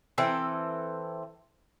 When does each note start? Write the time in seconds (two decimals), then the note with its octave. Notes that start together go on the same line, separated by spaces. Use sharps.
0.18 E3 C4 A4